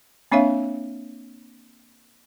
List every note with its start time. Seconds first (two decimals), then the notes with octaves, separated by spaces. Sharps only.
0.32 A#3 C4 D4 C#5 E5 F5